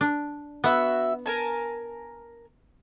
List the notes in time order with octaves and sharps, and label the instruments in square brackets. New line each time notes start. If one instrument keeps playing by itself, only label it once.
[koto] D4
[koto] B3 [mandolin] F#4 E5
[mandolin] A#4 G#5 A5